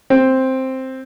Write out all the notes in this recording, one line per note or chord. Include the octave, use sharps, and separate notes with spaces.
C4